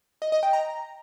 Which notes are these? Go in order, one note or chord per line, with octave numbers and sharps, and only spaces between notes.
D#5
D#5
G5
A#5